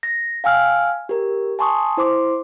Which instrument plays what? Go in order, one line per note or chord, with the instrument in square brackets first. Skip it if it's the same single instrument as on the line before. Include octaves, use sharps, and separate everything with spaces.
[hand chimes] A#6
F5 G5 G#5 E6 F6
G4 A#4
G#5 A5 C6 C#6 D#6
E4 C5 C6 D6